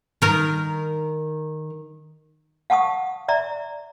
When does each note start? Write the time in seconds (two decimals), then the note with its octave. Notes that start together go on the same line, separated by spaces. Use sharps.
0.22 D#3 A#4
2.70 F5 F#5 A5 C#6 D#6
3.28 D5 E5 A#5